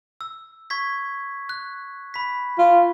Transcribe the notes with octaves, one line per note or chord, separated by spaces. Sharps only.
E6
C#6 G#6 B6
F#6
B5 B6
F4